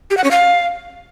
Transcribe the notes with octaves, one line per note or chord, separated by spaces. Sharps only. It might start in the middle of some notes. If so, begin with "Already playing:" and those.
G4
F#5
C#4
F5